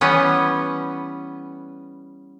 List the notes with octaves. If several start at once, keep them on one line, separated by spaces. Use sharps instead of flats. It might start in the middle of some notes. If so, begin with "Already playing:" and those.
E3 G3 B3 C#4